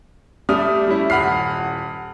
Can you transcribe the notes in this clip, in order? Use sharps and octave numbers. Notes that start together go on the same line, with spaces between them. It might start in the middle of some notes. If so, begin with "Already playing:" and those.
G3 A3 D5 D#6 F6
G3 C#4 E4
D#1 F#5 B5 F6 C7